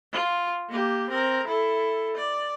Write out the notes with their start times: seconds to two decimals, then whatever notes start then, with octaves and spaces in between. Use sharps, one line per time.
0.12 F4
0.70 A#3 G4
1.10 C4 A#4
1.48 E4 A4
2.17 D5